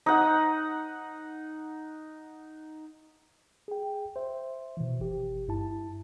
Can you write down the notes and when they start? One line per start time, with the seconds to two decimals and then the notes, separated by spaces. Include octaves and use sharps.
0.06 D#4 F#5
3.68 G#4 G5
4.16 C5 E5
4.77 B2 D#3 E3
5.00 G1 G4
5.48 G2 E4 A5